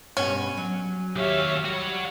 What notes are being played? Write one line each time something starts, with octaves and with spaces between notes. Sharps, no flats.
G2 B2 B3 C#4
F#3
D#2 G4 C#5 E5 F5
G3 F#4 C#5